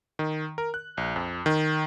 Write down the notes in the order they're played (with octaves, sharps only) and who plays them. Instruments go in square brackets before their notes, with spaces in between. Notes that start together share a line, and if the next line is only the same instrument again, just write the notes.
[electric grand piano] D#3
A#4
F#6
A#1
F2
D#3